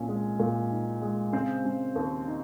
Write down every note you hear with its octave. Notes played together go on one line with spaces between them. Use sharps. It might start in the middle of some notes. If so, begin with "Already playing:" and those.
Already playing: C2 A#2 C#4
G#3
A#2
D#4
G#3
C#3 C4 C5
C#3
D#2
D#4